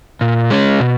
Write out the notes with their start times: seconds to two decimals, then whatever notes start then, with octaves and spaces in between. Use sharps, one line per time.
0.21 A#2
0.50 G#3 C#4
0.80 B2